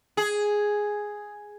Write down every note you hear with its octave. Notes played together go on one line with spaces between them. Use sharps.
G#4